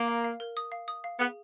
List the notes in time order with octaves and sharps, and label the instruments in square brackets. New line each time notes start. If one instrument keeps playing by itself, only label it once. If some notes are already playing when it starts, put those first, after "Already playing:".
Already playing: [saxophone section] A#3 [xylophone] A#4
[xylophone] F5
F5
A#4
D#6
F5
D#6
F5
[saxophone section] B3 [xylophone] G#4